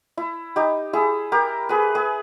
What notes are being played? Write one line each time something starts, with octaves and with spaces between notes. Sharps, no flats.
E4
D#4 G4
E4 G#4
G4 A#4
G#4 B4
G#4 B4